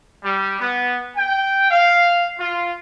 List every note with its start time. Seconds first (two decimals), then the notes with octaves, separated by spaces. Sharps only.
0.23 G3
0.60 B3
1.17 G5
1.71 F5
2.39 F4